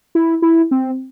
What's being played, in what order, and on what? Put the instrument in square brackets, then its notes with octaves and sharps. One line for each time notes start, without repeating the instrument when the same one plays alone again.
[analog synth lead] E4
E4
C4